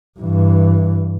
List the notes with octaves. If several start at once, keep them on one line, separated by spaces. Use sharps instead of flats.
G2 E3